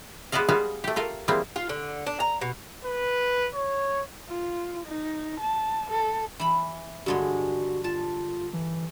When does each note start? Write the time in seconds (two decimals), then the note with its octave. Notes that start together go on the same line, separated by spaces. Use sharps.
0.32 G#3 B3 F#4 D5 D#5 F5
0.48 G3 G#3 B3 F#4 F5
0.84 A3 G4
0.96 F4 A4 A#4
1.28 E3 G3 G#3 A#3 C4
1.56 F4
1.69 D3
2.07 D4
2.20 A#5
2.41 B2
2.84 B4
3.54 C#5
4.29 F4
4.86 D#4
5.40 A5
5.90 A4
6.40 E3 B5
7.06 G2 D3 G#3 F#4
7.84 F4 A5
8.53 E3